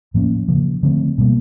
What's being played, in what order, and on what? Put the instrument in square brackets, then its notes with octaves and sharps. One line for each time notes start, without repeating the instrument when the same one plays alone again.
[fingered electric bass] A2 F3 A#3 C#4
C#3 F3 A#3
D3 F3 A3 C4
B2 G3 A#3